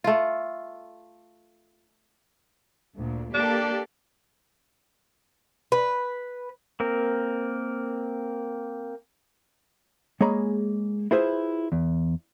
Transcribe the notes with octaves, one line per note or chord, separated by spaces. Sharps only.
A3 F4
D2 A#2
A#3 D4 G4 A4
B4
A#3 C4 A#4
G#3 A#3 G#4 C#5 A#5 B5
E4 F4 G#4 B4 C5 E5
E2